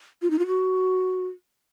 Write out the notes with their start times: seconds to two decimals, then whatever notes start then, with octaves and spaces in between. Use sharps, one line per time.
0.22 F4
0.30 D#4
0.39 F4
0.47 F#4